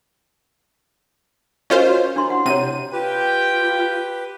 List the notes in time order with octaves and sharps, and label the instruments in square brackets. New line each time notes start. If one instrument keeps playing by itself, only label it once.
[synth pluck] C#4 F4 C5 [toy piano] F#4 A#4 D#5
[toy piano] F#4 C#5
D4 E4 C6
F#5
[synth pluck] C3 D#7 [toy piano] E4 C#5
[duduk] F4 [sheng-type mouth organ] G4 B4 [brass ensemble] G5